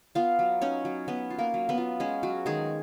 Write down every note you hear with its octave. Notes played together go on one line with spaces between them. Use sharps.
B3 F4 F5
F#3
C#4 D#4 C#5
F#3
B3 C#4 B4
F4
A#3 A#4
F#3
B3 B4
F4
G#3 C#4 G#4
F#3 F#4
D#3 G#3 G#4